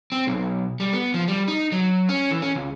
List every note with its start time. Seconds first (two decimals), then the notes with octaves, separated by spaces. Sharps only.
0.12 C4
0.27 B1
0.80 G3
0.93 B3
1.14 F3
1.28 G3
1.48 D#4
1.72 F#3
2.09 C#4
2.31 E3
2.42 C#4
2.55 C#2